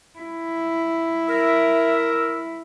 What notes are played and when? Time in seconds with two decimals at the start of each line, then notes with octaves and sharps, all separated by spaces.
0.19 E4
1.29 A#4 E5